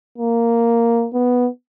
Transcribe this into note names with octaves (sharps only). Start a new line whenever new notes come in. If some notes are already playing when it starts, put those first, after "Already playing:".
A#3
B3